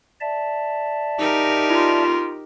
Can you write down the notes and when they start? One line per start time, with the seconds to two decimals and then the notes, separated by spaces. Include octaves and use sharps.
0.21 D5 E5 A5
1.18 D#4 G4 A#4
1.70 F4